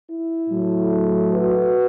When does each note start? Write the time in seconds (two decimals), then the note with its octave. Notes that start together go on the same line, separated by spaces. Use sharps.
0.09 E4
0.50 A2 F#3 A3
1.31 F#4 B4